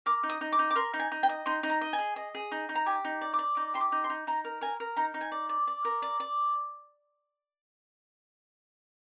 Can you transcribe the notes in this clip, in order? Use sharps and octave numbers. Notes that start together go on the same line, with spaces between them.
A#4 D6
D#4
D#6
D#4
D6
D#4
D6
A#4 C6
D#4
G#5
D#4
G5
D#5
D#4 C6
D#4
A#5
D#5
G#5
G#4
D#5
G#4
D#4
D#4
A#5
G4 G#5
D#4
D5
D6
D5
D#4 D6
G4 C6
D6
D#4
C6
D#4
D#4 A#5
A#4
A#4 G#5
A#4
D#4 A#5
D#4
G#5
D5
D5
D5
A#4
D5
D5